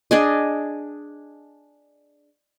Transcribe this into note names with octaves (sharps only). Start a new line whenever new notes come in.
D4 G#4 D#5